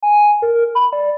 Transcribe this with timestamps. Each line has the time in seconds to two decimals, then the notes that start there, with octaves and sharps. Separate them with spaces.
0.03 G#5
0.42 A#4
0.75 B5
0.93 D5